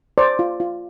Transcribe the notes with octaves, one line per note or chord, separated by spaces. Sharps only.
C5 D5
F4
F4